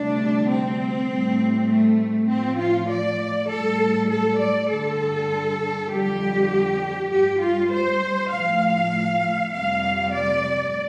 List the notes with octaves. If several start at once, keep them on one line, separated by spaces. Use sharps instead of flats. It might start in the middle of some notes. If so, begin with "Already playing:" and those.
Already playing: D2 C3 G3 D4
C4
A2 G3
A3
A2 F3 C4
F4
D5
A2 G3 A4
A4
D5
G2 D3 G3 A4
F2 D3 G3 G4
G2 G3 G4
F4
C5
A2 F3 F5
F2 C3 G3 F5
D5